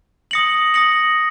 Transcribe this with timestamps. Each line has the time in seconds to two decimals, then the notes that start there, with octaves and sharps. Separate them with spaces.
0.31 D#6 A#6 C#7 F#7
0.74 D#6 A#6 C#7 F#7